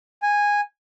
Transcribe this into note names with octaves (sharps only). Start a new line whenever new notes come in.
G#5